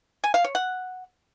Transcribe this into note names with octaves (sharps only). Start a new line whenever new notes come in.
G#5
F5
C#5
F#5